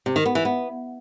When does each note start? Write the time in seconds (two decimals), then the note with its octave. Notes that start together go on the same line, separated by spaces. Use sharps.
0.06 C3
0.16 D#3
0.26 B3
0.35 E3
0.45 B3